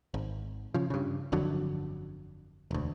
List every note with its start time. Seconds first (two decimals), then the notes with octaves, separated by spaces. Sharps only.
0.14 G#1
0.74 C#3 F3
0.90 G2 C#3
1.32 G1 F2 D3 F#3
2.71 E1 D2